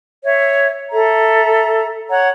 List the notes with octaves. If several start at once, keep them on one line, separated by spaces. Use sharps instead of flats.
C#5 E5
A4 E5 A#5
C#5 F#5 A#5